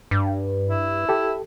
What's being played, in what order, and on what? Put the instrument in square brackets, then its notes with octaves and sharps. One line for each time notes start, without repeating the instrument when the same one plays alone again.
[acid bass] G2
[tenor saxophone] E4
[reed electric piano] G4 A4